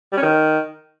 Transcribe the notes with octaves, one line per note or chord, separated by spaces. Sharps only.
G3
C#4
D#3